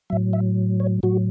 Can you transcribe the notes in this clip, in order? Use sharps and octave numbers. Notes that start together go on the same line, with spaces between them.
A2 F#3 E5
E5
C#5
A2 F#3 F#4